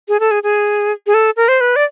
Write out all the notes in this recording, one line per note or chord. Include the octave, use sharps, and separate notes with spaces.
G#4
A4
G#4
G#4
G#4
A4
A#4
C5
B4
D5